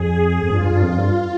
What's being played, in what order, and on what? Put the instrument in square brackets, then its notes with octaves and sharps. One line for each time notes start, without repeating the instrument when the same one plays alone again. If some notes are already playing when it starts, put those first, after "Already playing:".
Already playing: [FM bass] F2 [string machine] G#4
[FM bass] F2
[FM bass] G2 [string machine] F4
[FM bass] G2
G2
F2
G2